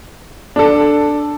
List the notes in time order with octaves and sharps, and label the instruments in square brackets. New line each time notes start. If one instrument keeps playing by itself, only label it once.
[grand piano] D4 A4